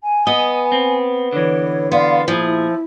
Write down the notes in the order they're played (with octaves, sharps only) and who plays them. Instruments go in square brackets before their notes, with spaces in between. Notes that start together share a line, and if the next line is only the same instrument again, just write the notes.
[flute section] G#5
[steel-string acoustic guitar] B3 [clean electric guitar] D#5
[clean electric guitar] C4
[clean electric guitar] D3 E3 [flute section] C#5
[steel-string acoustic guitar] B3 [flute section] D5 F5 C6
[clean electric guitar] A#2 G#4 [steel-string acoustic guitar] F3 [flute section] E4